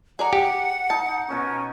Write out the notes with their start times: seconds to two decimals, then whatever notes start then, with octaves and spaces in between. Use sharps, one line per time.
0.19 G#4 D5 F#5 A#5
0.33 G4
0.90 D#4 A5
1.28 B2 C#4 A#4 C#6